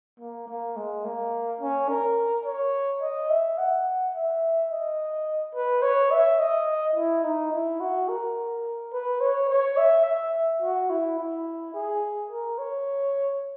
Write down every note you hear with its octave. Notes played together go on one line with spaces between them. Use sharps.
A#3
A#3
G#3
A#3
C#4
A#4
C#5
D#5
E5
F#5
E5
D#5
B4
C#5
E5
D#5
E4
D#4
E4
F#4
A#4
B4
C#5
C#5
E5
E5
F#4
E4
E4
G#4
A#4
C#5